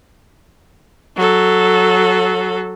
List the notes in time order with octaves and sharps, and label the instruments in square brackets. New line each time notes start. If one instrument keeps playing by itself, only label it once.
[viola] F#3 A4